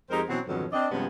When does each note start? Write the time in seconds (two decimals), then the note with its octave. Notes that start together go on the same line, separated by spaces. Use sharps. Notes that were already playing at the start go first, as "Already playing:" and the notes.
0.10 F2 G#3 D#4 G4 A#4 C5
0.28 B2 E3 F#3 C4 C#4 F#4
0.46 F2 G#2 B2 D3 D#3 F#3
0.72 C4 D4 D#5
0.91 G2 C3 F3 G#3 B3 C#4